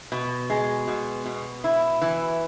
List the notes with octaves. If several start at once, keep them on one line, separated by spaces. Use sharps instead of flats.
B2
G#3
B2
B2
E4
E3